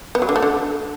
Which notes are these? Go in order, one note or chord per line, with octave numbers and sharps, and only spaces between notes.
B3
F#3
D3
A3
D3